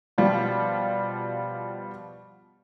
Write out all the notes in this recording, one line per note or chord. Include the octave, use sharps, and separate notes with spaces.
B2 F3 G3 F4